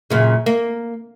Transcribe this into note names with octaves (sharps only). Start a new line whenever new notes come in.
F#2 A#2 C#3
A#3